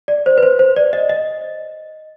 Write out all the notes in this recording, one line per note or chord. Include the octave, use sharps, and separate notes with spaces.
D5
C5
B4
C5
C5
D5
D#5
D#5